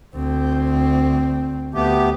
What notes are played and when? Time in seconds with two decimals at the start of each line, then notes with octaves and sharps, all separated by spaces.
0.15 D2 C4
1.74 D2 A3 B3 G4